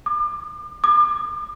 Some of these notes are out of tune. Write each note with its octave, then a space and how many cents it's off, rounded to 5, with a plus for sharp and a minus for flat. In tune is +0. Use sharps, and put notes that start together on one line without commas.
D6 +40
D6 +40